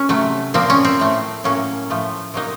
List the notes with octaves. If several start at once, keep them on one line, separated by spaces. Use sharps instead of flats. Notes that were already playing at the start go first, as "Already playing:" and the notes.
Already playing: C#4
C3 F#3 A3
A#2 F3 A#3 C4
C#4
C4
A2 A3
A2 F#3 A#3 C#4
A2 F3 A3
C3 F#3 A#3 D#4